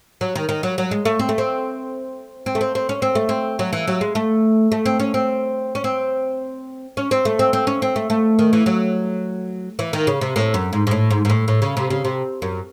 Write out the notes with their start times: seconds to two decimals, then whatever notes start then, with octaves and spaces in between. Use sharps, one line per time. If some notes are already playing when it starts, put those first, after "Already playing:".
0.21 F#3
0.36 D#3
0.49 D#3
0.63 F#3
0.78 F#3
0.91 G#3
1.05 A3
1.19 C4
1.29 A3
1.38 C4
2.46 C4
2.55 A3
2.61 C4
2.75 C4
2.89 C#4
3.02 C4
3.15 A3
3.29 C4
3.59 F#3
3.73 E3
3.87 F#3
4.01 G#3
4.15 A3
4.72 A3
4.86 C4
5.00 C#4
5.14 C4
5.75 C#4
5.84 C4
6.97 C#4
7.11 C4
7.25 A3
7.39 C4
7.53 C4
7.67 C#4
7.82 C4
7.96 A3
8.10 A3
8.39 D#3
8.53 E3
8.66 F#3
9.79 E3
9.93 D#3
10.07 C#3
10.21 C3
10.36 A2
10.54 F#2
10.73 G#2
10.87 G#2
10.91 A2
11.10 G#2
11.25 G#2
11.30 A2
11.48 A2
11.62 C#3
11.77 C3
11.90 C#3
12.04 C3
12.42 F#2